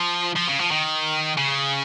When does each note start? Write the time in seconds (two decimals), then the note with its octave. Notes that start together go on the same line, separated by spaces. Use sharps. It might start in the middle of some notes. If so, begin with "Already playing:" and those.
Already playing: F3
0.36 F3
0.48 C#3
0.59 F3
0.71 D#3
1.38 C#3